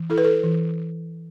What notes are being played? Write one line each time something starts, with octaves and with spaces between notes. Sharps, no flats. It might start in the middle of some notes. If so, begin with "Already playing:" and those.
Already playing: E3
E4 A4
B4
A4
E3